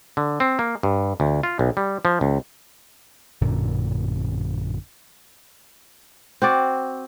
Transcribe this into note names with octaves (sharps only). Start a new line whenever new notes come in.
D3
C4
A#3
G2
D2
F4
B1
G3
F3
C#2
A1 F#2 A#2 D3
C4 F#4 D5